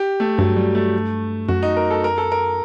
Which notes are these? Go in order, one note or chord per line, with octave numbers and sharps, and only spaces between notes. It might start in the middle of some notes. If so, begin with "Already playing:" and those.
Already playing: G4
A3
G2 F#3
G3
A3
F#2 F#4
D#4
A#4
A4
A#4
A4
A#4